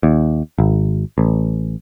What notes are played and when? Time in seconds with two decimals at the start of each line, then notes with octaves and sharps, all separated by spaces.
0.03 D#2
0.58 G#1
1.18 A1